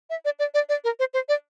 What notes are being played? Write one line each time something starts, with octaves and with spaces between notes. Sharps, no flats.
E5
D5
D5
D5
D5
A#4
C5
C5
D5